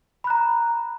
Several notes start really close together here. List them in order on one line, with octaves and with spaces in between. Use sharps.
B5 F#6 A#5